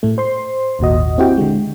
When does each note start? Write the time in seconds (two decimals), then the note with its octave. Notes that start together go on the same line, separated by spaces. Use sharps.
0.03 A2 A3
0.18 C5 C6
0.79 G#1 D#2 A#2 F#4 D#5
1.18 C4 E4 F#4 G4 G5
1.38 D3 G#3